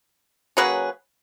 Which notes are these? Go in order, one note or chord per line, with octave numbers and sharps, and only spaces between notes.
F#3 A#3 C#4 G#4 B4